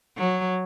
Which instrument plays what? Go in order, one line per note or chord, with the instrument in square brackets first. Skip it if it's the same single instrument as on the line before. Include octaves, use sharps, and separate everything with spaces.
[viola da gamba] F#3